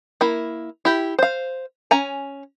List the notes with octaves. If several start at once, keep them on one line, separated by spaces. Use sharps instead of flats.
A#3 E4
E4 G4
C5 F5
C#4 G#5 A#5